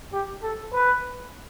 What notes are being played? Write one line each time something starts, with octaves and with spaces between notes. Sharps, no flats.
G4
A4
B4